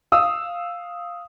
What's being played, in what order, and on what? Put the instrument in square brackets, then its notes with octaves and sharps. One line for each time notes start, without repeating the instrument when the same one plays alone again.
[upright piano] F5 D#6 E6